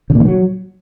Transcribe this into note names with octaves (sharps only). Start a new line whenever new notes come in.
C#3
A#2
D#3
F#3